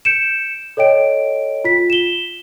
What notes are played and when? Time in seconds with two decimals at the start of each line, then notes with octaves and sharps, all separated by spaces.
0.05 G6 C#7 D7 E7
0.77 A4 C#5 D#5 G5 D7
1.65 F4 B6
1.90 E7 G7